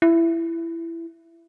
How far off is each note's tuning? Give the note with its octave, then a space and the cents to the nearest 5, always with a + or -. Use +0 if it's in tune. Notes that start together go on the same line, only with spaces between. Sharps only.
E4 +15